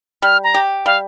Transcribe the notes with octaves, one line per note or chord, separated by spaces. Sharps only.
G3 F6
A#5
G4
G3 F5